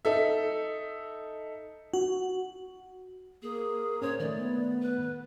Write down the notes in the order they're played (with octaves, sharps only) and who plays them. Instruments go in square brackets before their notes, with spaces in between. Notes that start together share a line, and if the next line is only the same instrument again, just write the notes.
[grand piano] D#4 A4 E5
[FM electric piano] F#4
[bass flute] A#3 [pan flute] G#4
[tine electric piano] C#4 C5 [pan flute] C#5
[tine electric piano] D#3 A3 [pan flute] D5
[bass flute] B3
[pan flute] B4